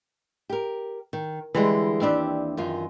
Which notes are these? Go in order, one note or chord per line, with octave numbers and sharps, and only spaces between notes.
G4 A#4
D#3
D3 E3 G3 G#3
D#2 C4 D4 E4 G4 D5
F#2 D#3 F4